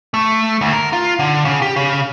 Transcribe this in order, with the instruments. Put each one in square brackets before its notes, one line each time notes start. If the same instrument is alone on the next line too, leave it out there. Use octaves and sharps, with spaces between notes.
[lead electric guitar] A3
D2
A#4
F4
D3
C#3
G4
C#3